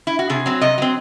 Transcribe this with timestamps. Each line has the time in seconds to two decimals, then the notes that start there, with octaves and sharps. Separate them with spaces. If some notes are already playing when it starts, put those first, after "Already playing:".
0.07 E4
0.19 F#4
0.30 C3 G#4
0.46 F#3 C4
0.61 C3 D#5
0.78 F#3 C4